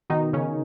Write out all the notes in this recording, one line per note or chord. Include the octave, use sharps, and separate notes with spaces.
B2 D#3 D#4
C#3 C#4